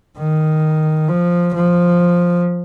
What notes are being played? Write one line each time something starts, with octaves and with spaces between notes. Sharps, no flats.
D#3
F3
F3